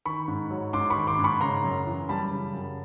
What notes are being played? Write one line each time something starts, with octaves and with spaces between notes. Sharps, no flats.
D#3 B5 C#6
G#2
F#3
G#2 C6 D6
B5 C#6
D#3
C6 D6
G#2
B5 C#6
C#3 A#5 C6
F#2
E3
G3 A5 B5
C#3
F#2